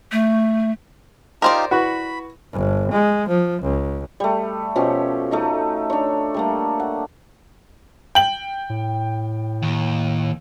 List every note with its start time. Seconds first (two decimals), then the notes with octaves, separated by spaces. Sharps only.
0.12 A3
1.42 D#4 F4 G4 A#4 C5 D5
1.71 E4 F#4 B4 B5 C#6
2.54 G1
2.92 G#3
3.29 F3
3.62 C#2
4.20 G3 A3
4.76 B2 F3 C#4 G4
5.31 A3 D#4 D#5
5.90 D4 C#5
6.34 G3 A3 A#3
6.80 F#5
8.15 G5 F#7
8.70 A2
9.63 D#2